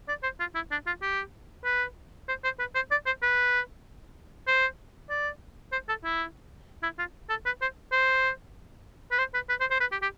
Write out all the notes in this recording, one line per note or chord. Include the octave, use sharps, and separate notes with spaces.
D5
C5
F4
E4
D4
F4
G4
B4
C5
C5
B4
C5
D5
C5
B4
C5
D5
C5
A4
E4
E4
F4
A4
B4
C5
C5
B4
C5
B4
B4
C5
C5
B4
G4
G4